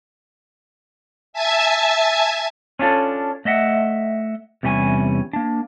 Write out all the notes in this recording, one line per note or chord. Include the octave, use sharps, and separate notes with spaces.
E5 G#5 A5 G#6
C#4 D4 F4 A4
A3 D#5 E5 F#5
E2 C3 G3 C#4 G#5
A#3 D4